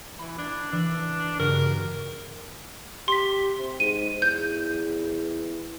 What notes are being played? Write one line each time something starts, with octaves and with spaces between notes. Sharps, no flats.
E3 B5
D4 G#6
E3 D4 E6
G2 C#3 F#4 A#4
G4 C6 B6
C3
G#2 D#7
E2 G6